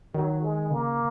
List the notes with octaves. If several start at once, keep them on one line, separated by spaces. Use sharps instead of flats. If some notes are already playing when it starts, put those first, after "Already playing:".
D#3 F#3
G#3
C#3 A#3